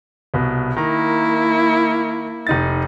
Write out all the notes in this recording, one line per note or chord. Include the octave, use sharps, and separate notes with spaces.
C2 B2
D#3 A#3 E4 A#5
F1 D#4 A6